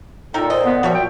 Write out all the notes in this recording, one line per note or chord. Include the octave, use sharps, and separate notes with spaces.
A#2 D#4 A4 A#4 G5
C5 D#5
B3
F3 G3 F#4 C#5 E5
G5